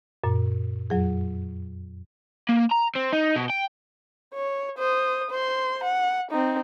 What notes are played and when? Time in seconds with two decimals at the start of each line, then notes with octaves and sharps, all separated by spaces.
0.24 F#2 A#2
0.90 F2 F#3 G#4
2.49 A#3
2.72 A#5
2.95 C4
3.13 D#4
3.36 B2
3.50 G5
4.34 C#5
4.78 C5 D#6
5.30 C5 C6
5.84 F#5
6.31 C4 D#4